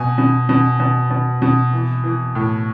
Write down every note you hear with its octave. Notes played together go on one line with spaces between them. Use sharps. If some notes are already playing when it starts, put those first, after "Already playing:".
Already playing: B2 G#5
B2
B2
B2
B2
B2
E3
E3
A2